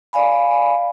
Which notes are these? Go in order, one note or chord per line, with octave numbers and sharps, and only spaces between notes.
D5 F5 G#5 B5